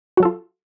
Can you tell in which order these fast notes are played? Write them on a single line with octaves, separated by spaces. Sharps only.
F#4 F#3 A4 F4